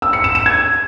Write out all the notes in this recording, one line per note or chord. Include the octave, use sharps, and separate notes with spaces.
E6
C#7
E7
E7
G#6